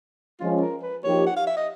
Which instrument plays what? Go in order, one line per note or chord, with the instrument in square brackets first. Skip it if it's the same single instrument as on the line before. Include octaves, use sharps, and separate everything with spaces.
[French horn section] F3 G#3 C#4 [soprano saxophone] F4
[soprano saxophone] A#4
B4
[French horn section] F3 A#3 D#4 G4 [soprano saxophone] C#5
[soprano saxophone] F#5
F5
E5
D#5